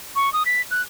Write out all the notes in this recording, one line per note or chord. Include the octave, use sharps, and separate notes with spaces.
C#6
D#6
B6
F#6